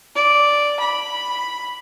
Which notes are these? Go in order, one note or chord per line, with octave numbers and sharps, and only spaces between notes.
D5
B5